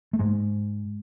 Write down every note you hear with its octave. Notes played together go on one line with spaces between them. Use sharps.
A3
G#2 G#3